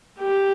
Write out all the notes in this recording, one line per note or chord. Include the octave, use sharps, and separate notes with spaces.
G4